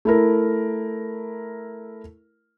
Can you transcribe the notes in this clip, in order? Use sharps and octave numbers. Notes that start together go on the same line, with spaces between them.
A3 E4 A#4